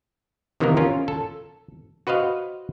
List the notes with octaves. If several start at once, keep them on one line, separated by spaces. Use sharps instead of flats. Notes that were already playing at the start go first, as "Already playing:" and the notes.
C3 D#3 E3 A#3 B3 A#4
C#4 F4 A#4
A4
F#4 B4 C5 D#5 F5